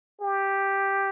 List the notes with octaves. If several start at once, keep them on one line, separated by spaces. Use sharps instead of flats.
G4